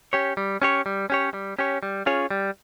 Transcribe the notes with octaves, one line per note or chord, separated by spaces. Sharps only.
C#4 G4 C#5
G3
C#4 G4 C#5
G3
C#4 G4 C#5
G3
C#4 G4 C#5
G3
C#4 F4 G#4 C#5
G3